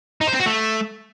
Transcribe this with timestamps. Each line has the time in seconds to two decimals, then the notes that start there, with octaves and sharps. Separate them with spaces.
0.21 D#4
0.27 C5
0.33 C4
0.40 F#4
0.46 A3